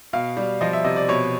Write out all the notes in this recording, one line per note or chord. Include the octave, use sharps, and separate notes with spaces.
B2 F5
G3
F3 D#5
E5
C3 D#5
D5
B2 C#5